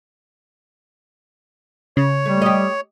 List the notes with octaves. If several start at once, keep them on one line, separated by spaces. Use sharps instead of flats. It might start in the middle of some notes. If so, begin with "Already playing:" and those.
C#3 C#5
G3 A3
G4 D#5